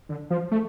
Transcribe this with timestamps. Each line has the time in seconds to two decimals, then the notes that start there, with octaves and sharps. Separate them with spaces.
0.09 D3
0.30 F3
0.51 A3